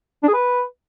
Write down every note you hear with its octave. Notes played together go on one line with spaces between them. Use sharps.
D4
G#4
B4